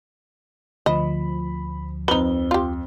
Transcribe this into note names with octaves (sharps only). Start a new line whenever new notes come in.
D2 F3 D#5 B5
F2 D#4 B4 G7
F4 G4